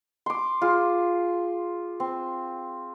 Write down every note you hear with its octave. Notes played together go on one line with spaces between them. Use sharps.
C6 D6
F4 G#4
C4